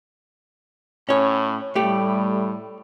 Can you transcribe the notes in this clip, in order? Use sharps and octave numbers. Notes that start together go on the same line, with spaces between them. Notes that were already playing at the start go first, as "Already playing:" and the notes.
A2 C#4 C#5
A2 G3 A3 G4